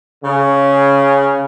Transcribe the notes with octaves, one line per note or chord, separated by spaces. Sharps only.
C#3